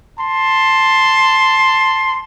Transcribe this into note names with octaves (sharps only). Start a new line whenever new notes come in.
A5 C6